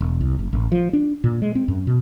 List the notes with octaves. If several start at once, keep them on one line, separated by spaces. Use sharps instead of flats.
E1
C2
F#1
A1
F3
D4
A#2
G#3
C4
F#2
B2